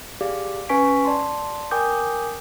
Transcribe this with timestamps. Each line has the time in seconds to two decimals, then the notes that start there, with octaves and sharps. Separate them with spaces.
0.21 G4 G#4 D5 F5 D6
0.69 C#4 B4 G#5 C#6 B6 D7
1.05 D5 A5 C6
1.71 A#4 G5 G#5 D6 D#6 G6